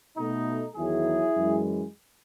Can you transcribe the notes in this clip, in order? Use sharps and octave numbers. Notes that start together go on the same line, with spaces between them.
B2 A3 D#4
E2 D#3 F#3 E4 G#4
F#2 E3 G#3